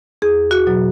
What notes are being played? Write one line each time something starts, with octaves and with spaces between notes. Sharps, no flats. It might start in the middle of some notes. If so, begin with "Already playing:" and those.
E2 G#4
F#4
B2 F#3